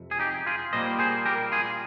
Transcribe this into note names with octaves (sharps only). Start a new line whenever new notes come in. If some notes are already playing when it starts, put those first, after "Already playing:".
Already playing: F2 C3
G#4
D#4 G4
F4 G#4
A#2 G3 A#3 C5 D#5
G#4 C5
G4 A#4
F4 G#4